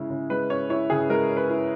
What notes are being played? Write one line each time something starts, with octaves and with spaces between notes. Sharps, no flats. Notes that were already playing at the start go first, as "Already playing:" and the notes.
Already playing: C#3 G#3 C#4 E4
C#3
G#3 B4
C#4 C#5
E4 C#5
C#3 G#4
G#3 A#4
C#4
B4
E4